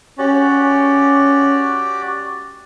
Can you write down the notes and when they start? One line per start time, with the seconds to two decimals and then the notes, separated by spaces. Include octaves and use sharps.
0.19 C#4 F#4 G4 D5